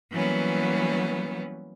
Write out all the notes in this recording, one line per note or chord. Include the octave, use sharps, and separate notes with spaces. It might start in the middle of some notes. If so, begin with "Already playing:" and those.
E3 F#3 G3 A#3 B3 C#4